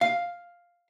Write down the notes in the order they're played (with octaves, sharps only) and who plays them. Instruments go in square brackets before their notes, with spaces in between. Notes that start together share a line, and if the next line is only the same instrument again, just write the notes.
[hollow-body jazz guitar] F5